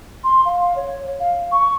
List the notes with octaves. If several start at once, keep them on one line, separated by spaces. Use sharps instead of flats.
C6
F5
C#5
F5
C#6